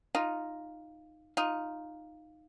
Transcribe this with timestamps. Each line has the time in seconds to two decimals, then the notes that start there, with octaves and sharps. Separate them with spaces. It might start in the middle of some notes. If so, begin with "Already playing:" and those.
0.15 D#4 F4
1.37 D#4 F4